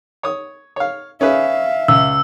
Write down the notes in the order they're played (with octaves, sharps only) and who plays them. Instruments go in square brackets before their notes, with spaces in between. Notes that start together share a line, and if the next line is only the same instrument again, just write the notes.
[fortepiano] C#5 D#6
C#5 F5
[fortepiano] C#4 G#4 B4 [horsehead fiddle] E5 F5
[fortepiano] C#2 [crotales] E6